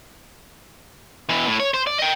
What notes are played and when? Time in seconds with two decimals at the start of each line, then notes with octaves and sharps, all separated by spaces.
1.29 B2 E3
1.47 A2
1.60 C#5
1.74 C5
1.87 D5
1.98 D#5 G5